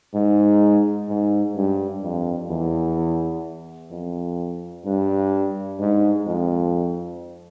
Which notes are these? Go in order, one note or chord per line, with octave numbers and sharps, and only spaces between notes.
G#2
G#2
G2
F2
E2
F2
G2
G#2
F2